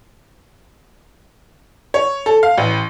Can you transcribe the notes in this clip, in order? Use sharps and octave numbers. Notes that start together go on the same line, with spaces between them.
C#5
A4
F5
A1